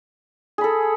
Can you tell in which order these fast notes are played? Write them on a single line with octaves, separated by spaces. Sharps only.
G#4 B5 A4